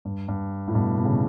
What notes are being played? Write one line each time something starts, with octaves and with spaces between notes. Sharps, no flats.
G2
G2
A2
G2 B2
B2
C#3
B2